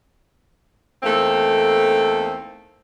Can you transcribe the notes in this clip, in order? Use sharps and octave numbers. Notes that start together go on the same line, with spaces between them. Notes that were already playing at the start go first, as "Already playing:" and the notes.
E2 A3 A#3 C4 D#4 A4